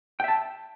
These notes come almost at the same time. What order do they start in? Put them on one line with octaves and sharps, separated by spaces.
G5 E5 A5